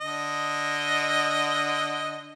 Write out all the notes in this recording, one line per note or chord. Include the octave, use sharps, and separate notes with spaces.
D3 D#5